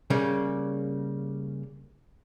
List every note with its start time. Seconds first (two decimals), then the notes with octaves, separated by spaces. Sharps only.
0.10 C#3 G3 A#3